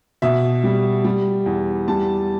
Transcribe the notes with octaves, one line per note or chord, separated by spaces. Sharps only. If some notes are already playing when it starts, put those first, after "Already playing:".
B2 E5
G3
G3
E2
G3 A5